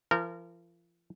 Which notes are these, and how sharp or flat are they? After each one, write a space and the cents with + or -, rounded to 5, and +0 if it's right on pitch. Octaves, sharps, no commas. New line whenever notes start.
F3 -40 A#4 -25